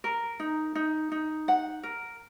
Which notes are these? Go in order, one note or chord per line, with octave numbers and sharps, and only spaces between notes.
A#4
D#4
D#4
D#4
F#5
A#4